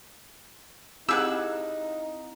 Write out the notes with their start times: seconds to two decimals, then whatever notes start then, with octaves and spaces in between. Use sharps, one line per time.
1.09 C4 D#4 E4 G4 G#4 F#5 E6